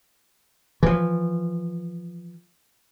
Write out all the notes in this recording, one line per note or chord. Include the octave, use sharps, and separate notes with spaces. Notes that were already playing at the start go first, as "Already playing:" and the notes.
E3 F3